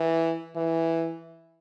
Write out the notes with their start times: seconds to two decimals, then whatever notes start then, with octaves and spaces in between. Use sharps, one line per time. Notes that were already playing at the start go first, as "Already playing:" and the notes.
Already playing: E3
0.56 E3